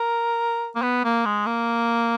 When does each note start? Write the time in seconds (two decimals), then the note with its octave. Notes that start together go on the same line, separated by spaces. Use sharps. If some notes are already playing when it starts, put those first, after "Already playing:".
Already playing: A#4
0.76 A#3
0.82 B3
1.04 A#3
1.26 G#3
1.47 A#3